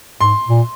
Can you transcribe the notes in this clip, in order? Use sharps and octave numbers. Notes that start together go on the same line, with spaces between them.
G#2 C6
A#2